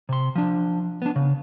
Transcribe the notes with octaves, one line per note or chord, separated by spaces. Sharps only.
C3 C6
F3 D4
B3 D4
C#3